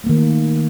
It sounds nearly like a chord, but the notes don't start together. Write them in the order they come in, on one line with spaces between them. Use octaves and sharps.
A3 A#3 D#3